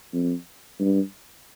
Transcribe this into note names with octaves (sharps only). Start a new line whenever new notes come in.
F2
G2